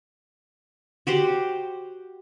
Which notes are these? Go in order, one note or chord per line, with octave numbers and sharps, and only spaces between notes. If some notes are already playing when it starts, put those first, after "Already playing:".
F#4 G4 C5